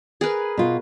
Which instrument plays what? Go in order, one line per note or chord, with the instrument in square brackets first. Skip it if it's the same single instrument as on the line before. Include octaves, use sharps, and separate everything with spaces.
[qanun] G#4 A#4 B4
[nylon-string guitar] B2 F4